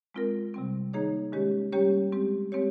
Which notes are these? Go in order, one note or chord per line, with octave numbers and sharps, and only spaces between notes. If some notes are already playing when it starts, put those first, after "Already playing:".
G#3 C4 F4 A#4
C3 G3 C4
D#3 A#3 D#4 G#4 C#5
D#3 G#3 C#4 G4 C#5
G3 A#3 C#4 G4 C#5
G#3 C4 G4
G#3 C4 G4 C#5